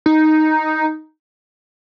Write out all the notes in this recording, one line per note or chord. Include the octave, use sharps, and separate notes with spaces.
D#4